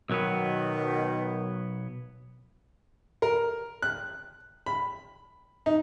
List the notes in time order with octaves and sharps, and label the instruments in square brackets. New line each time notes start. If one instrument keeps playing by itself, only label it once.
[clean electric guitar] B1 F#3 B3 [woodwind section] B2 D#3
[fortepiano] A#4
F#6
B5
D#4